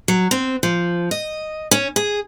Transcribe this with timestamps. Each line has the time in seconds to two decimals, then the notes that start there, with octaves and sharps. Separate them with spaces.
0.08 F#3
0.31 C4
0.63 F3
1.11 D#5
1.71 C#4
1.96 G#4